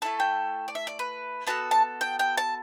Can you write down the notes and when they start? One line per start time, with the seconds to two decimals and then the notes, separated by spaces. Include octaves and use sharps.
0.02 A3 E4 A4 A5
0.20 G5
0.68 D5
0.75 E5
0.87 D5
0.99 B4
1.47 B3 F#4 A4 A5
1.71 A5
2.01 G5
2.19 G5
2.37 A5